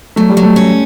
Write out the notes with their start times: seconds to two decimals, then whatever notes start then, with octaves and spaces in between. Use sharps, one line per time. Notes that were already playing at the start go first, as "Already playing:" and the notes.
0.16 F#3 A3
0.29 G3
0.37 F#3
0.43 A3
0.56 C#4